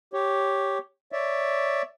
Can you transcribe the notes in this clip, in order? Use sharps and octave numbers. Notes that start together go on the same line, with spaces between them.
G4 C#5
C#5 D5 E5